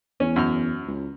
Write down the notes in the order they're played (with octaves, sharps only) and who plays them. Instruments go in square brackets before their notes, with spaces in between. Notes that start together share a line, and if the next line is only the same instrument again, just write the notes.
[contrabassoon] E2 [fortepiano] C#4
[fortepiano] F#2 F6
[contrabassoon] C#2